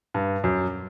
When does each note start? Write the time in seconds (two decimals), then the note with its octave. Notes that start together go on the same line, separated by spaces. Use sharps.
0.14 G2
0.44 F#2